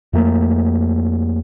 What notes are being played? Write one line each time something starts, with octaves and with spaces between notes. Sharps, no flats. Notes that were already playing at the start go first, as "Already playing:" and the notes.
F2 A3 A#3